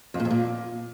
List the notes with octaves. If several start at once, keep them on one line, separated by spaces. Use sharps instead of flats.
F2
A#2
F2
A#2